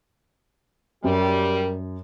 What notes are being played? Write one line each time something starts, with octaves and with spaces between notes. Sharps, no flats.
F#2 G3 G4 A#4